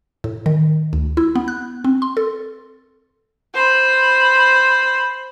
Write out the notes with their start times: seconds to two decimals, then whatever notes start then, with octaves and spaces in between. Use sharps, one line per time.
0.24 A2
0.46 D#3
0.93 D2
1.17 E4
1.35 B3
1.48 F#6
1.84 C4
2.02 C6
2.17 A4
3.54 C5 B5